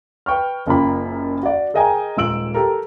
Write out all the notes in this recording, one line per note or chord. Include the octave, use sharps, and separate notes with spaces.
B4 G5 C#6 F6
F#1 F#2 A#3 F4 G5 B5
F#4 D5
G#4 A#4 D#5 G5 G#5 A#5
D#1 G#2 F4 E6 D7 F#7
G4 A4 A#4